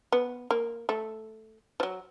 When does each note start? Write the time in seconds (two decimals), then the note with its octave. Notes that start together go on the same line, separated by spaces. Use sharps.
0.12 B3
0.51 A#3
0.89 A3
1.80 F3
1.83 F#3